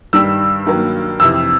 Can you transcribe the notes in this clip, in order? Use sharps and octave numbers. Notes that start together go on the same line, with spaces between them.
G2 D#3 G3 E6
G2 D#3 F#3 A#3
F2 C3 E3 E6